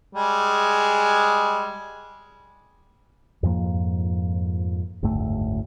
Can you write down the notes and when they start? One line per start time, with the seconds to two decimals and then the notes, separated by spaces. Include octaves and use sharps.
0.15 G3 G#3 G#4
3.43 F2 G#2 F3 A#3
5.03 F#1 D2 G#2 A3